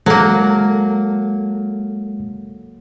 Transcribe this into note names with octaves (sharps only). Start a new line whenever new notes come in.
F#3 G#3 A#3 A4